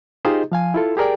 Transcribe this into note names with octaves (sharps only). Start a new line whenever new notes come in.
D#4 F4 G4 G#4 C5 D#5
F3 F5 G#5
E4 F4 A4
G4 G#4 A#4 D5 G5